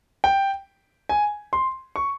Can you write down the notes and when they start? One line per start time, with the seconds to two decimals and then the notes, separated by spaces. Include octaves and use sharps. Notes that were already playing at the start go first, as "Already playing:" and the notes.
0.24 G5
1.09 G#5
1.53 C6
1.96 C#6